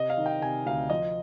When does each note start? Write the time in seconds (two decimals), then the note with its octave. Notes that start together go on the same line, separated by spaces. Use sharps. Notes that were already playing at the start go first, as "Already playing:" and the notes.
Already playing: C3 D#5
0.10 F5
0.18 D#3
0.26 G5
0.41 C3 G#5
0.66 D2 F5
0.90 F3 D#5